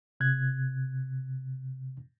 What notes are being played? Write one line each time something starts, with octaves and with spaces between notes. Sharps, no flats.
C3 F#6 G#6